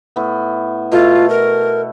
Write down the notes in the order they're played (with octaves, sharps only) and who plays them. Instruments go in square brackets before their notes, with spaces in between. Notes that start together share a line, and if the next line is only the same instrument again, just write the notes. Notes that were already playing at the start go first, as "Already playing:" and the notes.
[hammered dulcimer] A2 B3
[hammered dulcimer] B2 A3 A4 [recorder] F4
[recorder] A#4